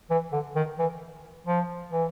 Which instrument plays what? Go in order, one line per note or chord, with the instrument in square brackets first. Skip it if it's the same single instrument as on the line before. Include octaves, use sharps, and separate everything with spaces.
[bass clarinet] E3
D3
D#3
E3
F3
E3